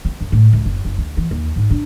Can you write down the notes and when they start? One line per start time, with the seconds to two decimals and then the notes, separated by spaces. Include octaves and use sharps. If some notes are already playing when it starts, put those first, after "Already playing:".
0.05 C4
0.21 F#2
0.32 A2
0.53 C#2
0.65 F#1
0.85 F#1
0.98 D2
1.17 E3
1.31 D#2
1.56 G#2
1.71 D4